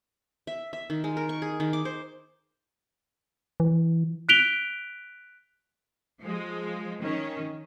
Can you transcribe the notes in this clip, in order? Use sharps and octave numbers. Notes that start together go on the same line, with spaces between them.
E5
E5
D#3
G#3
A#4
C#6
G#4
D#3
D6
C5
E3
F#6 B6 D7 F7 G7
F3 G#3
D#3 C#4